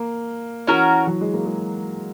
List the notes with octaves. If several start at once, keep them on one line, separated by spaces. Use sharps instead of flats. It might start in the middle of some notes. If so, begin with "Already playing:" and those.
Already playing: A#3
E3 C#4 F#4 A#4
F#3
G#3
A#3
G#3